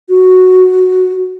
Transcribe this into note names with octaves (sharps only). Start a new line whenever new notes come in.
F#4